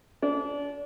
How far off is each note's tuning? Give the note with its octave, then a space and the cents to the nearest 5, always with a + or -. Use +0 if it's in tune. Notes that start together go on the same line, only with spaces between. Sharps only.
D4 -35